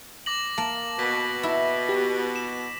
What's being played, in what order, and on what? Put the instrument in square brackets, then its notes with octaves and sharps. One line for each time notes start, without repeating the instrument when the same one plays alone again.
[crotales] D6 A#6 F#7
[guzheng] A#3 [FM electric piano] A5
[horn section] B2 [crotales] B6
[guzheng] E4
[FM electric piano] G4
[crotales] E7